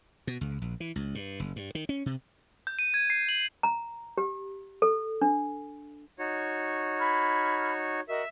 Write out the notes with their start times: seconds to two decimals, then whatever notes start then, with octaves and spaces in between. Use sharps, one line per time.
0.27 B2
0.41 C#2
0.62 A#1
0.80 E3
0.96 C#2
1.15 G2
1.40 F#1
1.56 G2
1.75 D#3
1.89 C#4
2.06 C3
2.67 G6
2.79 D#7
2.94 G#6
3.10 C7
3.29 F#7
3.63 A#5
4.18 G4
4.82 A4
5.22 D4
6.19 D#4 F#4 C#5
6.99 B5 F6 G#6
8.08 F#4 A#4 D#5 E5